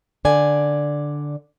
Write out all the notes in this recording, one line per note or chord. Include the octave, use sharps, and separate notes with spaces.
D3 D5 G#5